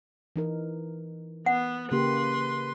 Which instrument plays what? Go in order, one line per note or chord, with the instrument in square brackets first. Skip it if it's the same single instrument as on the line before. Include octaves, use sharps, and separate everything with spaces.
[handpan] E3 D#4 A#4
[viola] B3 [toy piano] F#5
[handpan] C#3 A#3 G4 [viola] B4 C6